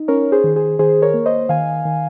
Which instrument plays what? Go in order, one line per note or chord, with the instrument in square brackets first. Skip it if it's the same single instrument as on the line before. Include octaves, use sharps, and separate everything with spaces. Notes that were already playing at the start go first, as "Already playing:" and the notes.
Already playing: [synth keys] D#4
C#4 A#4 C#5
G#4 C5
D#3
G#4 C5
D#3 G#4 C5
A#4 C#5
A#3
C5 D#5
D#3 F5 G#5
D#3